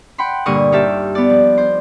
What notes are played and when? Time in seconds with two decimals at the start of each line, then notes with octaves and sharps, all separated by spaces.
0.18 F#5 G5 B5 C6
0.46 G2 A#2 D3 A#4 C#6 D#6
0.72 D#4 F4 G4 E5 A5
1.15 B3 D5
1.30 F3
1.58 C5